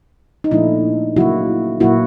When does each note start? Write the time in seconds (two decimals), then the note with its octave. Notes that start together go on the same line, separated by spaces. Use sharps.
0.44 D#4
0.51 A#2 F3 A3 D4 E4
1.16 C#3 F#3 A#3 E4 F#4
1.80 A#2 F#3 A#3 E4 F#4